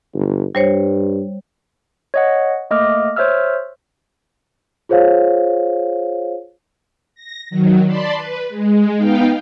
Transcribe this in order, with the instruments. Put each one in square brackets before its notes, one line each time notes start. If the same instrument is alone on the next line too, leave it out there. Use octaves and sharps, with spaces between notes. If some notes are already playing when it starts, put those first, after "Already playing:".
[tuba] G1
[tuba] G2 [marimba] G3 C5 C#5
[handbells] C#5 D#5 F#5
A3 A#3 D#5 D6 F6
C5 C#5 E5 E6 F6
[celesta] F4 G#4 C5 C#5 F5
[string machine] A#6
D#3 F#3
D5 A5 B5 C6
B4
G#3
B3 D#4 F5 G5